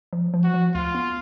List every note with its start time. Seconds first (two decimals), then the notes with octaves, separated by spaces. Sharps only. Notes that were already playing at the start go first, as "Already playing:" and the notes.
0.13 F3
0.34 F3
0.44 F#4
0.54 F3
0.74 D2 F4
0.95 B3